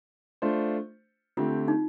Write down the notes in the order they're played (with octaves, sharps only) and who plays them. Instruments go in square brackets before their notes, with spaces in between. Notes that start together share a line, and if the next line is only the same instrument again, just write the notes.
[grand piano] A3 D4 F4 C5
[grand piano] D3 A3 C4 G4 [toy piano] F4
[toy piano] D#4